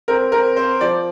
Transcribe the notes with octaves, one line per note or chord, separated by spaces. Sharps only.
C4 A#4
C4 A#4
C4 C5
F3 D5